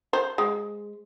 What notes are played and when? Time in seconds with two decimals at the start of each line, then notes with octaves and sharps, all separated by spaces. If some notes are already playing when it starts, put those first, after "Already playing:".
0.13 C5
0.38 G#3